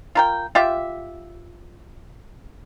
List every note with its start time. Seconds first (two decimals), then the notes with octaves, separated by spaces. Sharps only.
0.15 F4 A#4 G5
0.55 F4 G4 E5